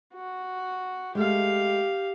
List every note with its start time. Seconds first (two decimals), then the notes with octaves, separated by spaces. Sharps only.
0.14 F#4
1.15 G#3 A3 G4 F5